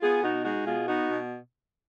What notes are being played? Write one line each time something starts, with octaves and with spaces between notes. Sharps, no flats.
B3 F4 G#4
B2 D#4 F#4
G#3 D#4 F#4
B2 F4 G#4
B3 D#4 F#4
B2